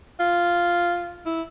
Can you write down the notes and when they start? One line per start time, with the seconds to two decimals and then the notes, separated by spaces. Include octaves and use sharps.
0.20 F4
1.26 E4